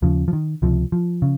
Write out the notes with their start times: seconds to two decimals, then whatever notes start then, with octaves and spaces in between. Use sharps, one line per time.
0.02 D#2 C#3 F3
0.28 F3
0.33 D#3
0.62 C#2 C3 F3
0.92 F3
1.22 C#3